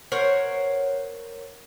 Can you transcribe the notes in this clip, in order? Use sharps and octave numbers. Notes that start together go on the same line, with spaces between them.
A#4 C5 C#5 F#5